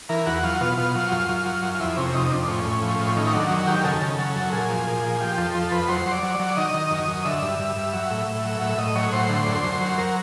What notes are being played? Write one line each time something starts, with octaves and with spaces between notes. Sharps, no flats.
E3 A#4
E2 F#4
F#3 F4
B2 F4
B2 F4
F#3 F4
F#2
F#2
F#3
F#2
F4
F2 E4
C3 C#4
F2 D#4
F2 D4
A2 C#4
A2
F3
A2
D#3 C#4
D#4
F#3 D4
F#2
D#3 G4
C#3 A4
C#3
F#3
F#2
A#2 G#4
F3
A#2
F3
F3 G4
F2 A4
F3 A4
F2 B4
F#3 C5
F#3
D5
F#3
D5
F#3
D#3 D#5
D#3
F#2
F#2
D3 E5
G2
G2
G2
F#3
A2
A2
F#3
A2 E5
A2 D#5
F#3 C#5
A2 C5
D3
F#2
F#2
F#3
F#3 A#4